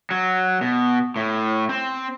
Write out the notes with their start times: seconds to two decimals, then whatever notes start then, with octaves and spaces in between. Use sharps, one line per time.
0.11 F#3
0.61 B2
1.16 A2
1.69 C4